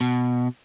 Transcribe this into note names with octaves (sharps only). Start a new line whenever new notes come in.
B2